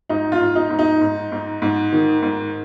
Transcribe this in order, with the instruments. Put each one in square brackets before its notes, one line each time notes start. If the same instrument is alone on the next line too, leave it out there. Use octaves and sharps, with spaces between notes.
[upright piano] G#2 D#4
F4
G#2
D#4
G#2
D#4
G#2
G#2
G#2
D#3
G#2